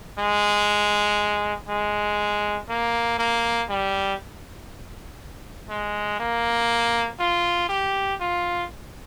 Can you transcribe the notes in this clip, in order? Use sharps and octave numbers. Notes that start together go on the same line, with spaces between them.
G#3
G#3
A#3
A#3
G3
G#3
A#3
F4
G4
F4